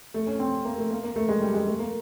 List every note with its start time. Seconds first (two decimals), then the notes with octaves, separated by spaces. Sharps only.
0.14 A3
0.27 C#4
0.39 C4
0.65 A#3
0.78 A3
0.91 A#3
1.04 A#3
1.16 A3
1.29 G#3
1.42 G3
1.54 G#3
1.67 A3
1.79 A#3